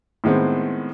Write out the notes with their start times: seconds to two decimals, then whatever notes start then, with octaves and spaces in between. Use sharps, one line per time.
0.24 A2 D#3 G#3 B3 C4